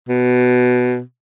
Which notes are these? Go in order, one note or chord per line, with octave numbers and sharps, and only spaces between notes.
B2